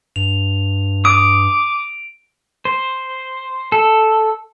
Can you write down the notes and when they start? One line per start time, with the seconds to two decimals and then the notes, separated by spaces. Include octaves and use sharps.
0.16 G2 F7
1.05 D6 D#6 D7
2.65 C5
3.72 A4